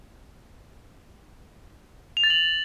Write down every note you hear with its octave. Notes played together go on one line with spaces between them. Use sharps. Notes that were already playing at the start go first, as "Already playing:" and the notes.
F7
A6
F#7